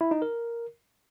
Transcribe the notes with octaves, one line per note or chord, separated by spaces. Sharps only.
E4
D#4
A#4